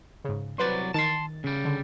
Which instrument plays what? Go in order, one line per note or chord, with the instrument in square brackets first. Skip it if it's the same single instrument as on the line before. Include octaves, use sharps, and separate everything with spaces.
[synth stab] G#2 C#3
[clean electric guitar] C2 F#3 D5 [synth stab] B4 C5
[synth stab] D#3 A6 [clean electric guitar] A5 C6
[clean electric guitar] C#3 G3
[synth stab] D3